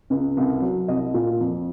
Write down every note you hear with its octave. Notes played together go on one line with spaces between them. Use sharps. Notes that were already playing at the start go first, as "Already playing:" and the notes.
C#2
C2
F#3
C2 D#5
A#2
F2